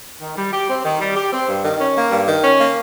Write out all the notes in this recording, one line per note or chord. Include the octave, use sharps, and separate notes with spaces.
D#3
G3
G4
C4
D#3
G3
G4
C4
G2
D#3
C#4
A#3
G2
D#3
C#4
A#3